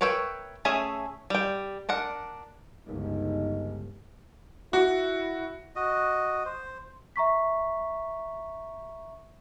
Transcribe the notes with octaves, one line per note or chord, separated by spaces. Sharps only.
A#4 B4 C#5 E5 G5
A3 C#4 G#4 E5
G3 G5
D4 A#4 F#5
G1 C#2 D#4
E4 F#4
F#4 D#5
C5
E5 A#5 C#6 B6